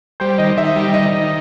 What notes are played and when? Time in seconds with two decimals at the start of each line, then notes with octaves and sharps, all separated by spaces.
0.20 G3 C5
0.38 D#3 D#5
0.57 D#3 E5
0.76 G3
0.94 D#3 D#5
1.12 D#3